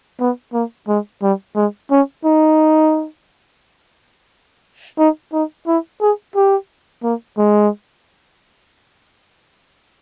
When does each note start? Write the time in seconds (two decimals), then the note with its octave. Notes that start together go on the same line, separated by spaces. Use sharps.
0.20 B3
0.53 A#3
0.88 G#3
1.22 G3
1.56 G#3
1.91 C#4
2.25 D#4
4.99 D#4
5.33 D#4
5.67 E4
6.01 G#4
6.36 G4
7.03 A#3
7.38 G#3